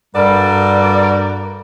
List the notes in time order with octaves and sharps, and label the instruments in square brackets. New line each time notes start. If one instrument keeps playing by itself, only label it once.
[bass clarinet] G2 [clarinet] G3 [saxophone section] F#4 A4 D5 [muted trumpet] A#4